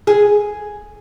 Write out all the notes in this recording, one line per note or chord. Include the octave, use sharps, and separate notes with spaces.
G#4